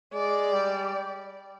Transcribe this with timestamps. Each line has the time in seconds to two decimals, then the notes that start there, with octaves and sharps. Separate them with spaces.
0.13 G#3 D5
0.52 G3